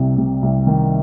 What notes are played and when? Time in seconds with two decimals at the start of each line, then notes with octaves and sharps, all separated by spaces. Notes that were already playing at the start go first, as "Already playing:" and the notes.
Already playing: C2 C3
0.18 C3
0.42 C2
0.67 D#3